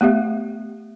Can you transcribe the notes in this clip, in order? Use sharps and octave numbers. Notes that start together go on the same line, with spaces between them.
A3 B3 G4 E5